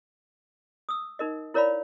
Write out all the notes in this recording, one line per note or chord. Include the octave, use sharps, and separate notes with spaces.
D#6 E6
D#4 A#4 D#5
E4 A#4 C#5 D5 F5 B5